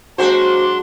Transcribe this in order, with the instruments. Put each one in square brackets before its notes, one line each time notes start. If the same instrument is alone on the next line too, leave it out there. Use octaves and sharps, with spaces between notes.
[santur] F#3 G#3 G#4 [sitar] A#3 F#4 C5 [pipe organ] D4 C6